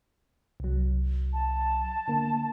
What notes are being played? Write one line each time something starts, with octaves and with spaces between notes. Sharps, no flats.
C2 F#3
A5
D3 A#3